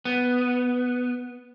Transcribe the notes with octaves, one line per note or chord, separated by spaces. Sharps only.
B3